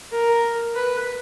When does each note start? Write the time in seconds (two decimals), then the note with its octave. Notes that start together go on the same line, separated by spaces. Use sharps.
0.12 A#4
0.75 B4